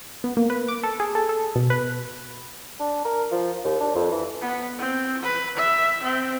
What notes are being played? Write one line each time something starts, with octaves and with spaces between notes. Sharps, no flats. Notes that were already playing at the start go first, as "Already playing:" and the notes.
B3
A#3
B4
D6
A4
G#4
A4
A4
B2
B4
D4
A#4
F3
D#2
D4
F2
E3
B3
C4
B4
E5
C4